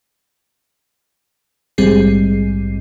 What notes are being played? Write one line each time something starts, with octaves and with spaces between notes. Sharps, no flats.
A#1 G#2 G3 C4 G#4 C7